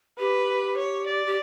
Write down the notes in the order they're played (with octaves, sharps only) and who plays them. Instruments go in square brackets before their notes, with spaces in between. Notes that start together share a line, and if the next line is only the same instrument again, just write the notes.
[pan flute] G4 [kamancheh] B4
[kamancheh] C#5
D5
[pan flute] G4